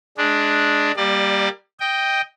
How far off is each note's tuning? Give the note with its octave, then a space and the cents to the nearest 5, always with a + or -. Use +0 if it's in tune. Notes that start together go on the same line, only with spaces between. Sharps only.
G#3 +15 D4 +0
G3 -5 A#3 +0 D5 +25
D#5 +0 G5 +0